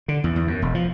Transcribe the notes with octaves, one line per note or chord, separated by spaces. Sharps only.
D3
E2
E2
F#2
E1
F3